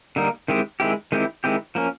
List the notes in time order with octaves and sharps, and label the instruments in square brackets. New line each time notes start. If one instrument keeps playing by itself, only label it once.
[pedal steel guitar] D3 G3 A#3 D#4
D#3 G#3 C4 E4 G4
D#3 G#3 C4 E4 G4
D#3 G#3 C4 E4 G4
D#3 G#3 C4 E4 G4
F3 A#3 C#4